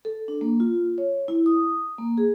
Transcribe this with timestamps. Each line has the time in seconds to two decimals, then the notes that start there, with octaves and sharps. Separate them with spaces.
0.05 A4
0.28 D4
0.41 A#3
0.60 F4
0.98 C#5
1.28 E4
1.46 D#6
1.98 A#3
2.18 G#4